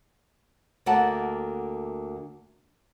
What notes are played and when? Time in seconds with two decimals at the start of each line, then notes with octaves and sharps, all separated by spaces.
0.86 D2 D3 A#3 F#5 A5